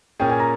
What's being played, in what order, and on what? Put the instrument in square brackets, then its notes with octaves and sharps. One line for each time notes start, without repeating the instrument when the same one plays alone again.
[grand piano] A#2 A#3 C#4 G#4 [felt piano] G5
[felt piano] G#5
A#5